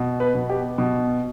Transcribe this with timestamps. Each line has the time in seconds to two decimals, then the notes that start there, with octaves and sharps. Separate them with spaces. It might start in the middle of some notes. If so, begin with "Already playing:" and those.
Already playing: B2
0.20 B4
0.35 B2
0.50 G4
0.78 B2